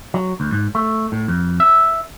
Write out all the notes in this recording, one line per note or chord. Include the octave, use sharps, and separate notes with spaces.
F#3
D2
G#2
A3
A2
F2
E5